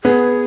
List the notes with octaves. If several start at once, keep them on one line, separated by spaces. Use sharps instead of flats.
B3 G#4